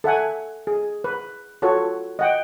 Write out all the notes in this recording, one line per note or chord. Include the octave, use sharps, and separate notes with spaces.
A4 E5 F#5 G#5
G#4
B4
F4 F#4 A4 B4 C#5
D#5 F#5 G5